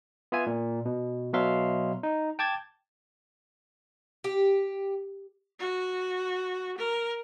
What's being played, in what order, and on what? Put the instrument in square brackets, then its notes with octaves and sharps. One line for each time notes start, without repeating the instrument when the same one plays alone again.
[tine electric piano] B3 F4 E5 G#5
A#2
B2
B2 F#3 E5 F5 C6
D#4
G5 A5 D6 G#6 A6
[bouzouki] G4
[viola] F#4
A#4